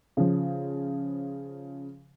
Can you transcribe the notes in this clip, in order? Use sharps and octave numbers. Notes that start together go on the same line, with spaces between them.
C#3 F3